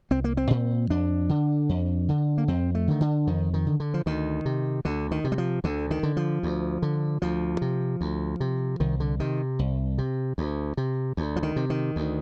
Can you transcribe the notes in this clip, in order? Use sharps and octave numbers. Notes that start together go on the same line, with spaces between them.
C2 C4
A#3
C4
A#2
F2 D4
D3
F2
D3
A#3
F2 C4
A3
D3 D#3
D3
F2 D#3
D#3
D3
D3
F3
D2 D#3
C3
D2 D3
D#3
C3
G3
F3
D2 D3
D#3
D3
F3
D2
D3
D2 F3
C3
D2
C3
C2 D#3
D3
C3 D#3
C2
C3
D2
C3
D2
F3
D#3
C3
D#3
D2